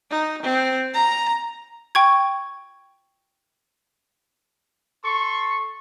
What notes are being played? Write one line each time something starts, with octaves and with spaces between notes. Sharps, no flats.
D#4
C4
A#5
G5 C#6 G#6
A4 C6 C#6